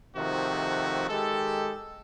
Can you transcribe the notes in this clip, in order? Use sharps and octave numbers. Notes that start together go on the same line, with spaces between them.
C3 D#3 F3 A3 F#4
D#3 G#3 G4 A4